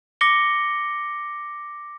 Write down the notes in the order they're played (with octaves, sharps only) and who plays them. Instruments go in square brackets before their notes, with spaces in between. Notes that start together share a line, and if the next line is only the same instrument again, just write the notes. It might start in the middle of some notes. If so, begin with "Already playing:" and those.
[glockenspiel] D6 A#6 C#7 G7